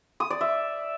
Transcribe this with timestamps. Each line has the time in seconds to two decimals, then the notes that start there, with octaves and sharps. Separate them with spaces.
0.20 D#6
0.30 D5
0.41 E5